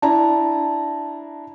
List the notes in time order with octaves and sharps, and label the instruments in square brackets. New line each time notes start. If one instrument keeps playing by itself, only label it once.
[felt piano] D4 E4 A#5 [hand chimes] A5